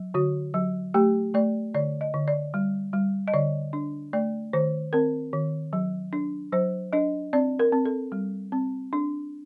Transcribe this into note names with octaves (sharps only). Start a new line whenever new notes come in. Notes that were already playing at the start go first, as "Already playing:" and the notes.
Already playing: F#3
D3 F#4
F#3
A3 G4
A3 D5
D3 D5
D#5
D3
D5
G3
G3
D#5
D3 D5
D4
A3 D5
D#3 C5
C4 A#4
D#3
F#3
D4
F#3 C5
D4 D#5
C4 D5
A#4
C4
A4
G3
C4
D4